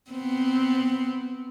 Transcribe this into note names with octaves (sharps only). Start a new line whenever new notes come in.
B3 C4